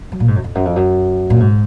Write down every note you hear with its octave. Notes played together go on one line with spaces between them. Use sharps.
F#3
A#2
G#2
F#2
F2
F#2
F2
F#2
A#2
G#2